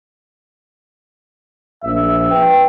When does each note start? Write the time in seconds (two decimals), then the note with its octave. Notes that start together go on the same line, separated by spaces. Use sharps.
1.84 A#1 E5
2.31 B4 G5